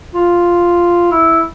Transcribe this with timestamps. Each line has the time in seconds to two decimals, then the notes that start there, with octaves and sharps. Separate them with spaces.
0.14 F4
1.11 E4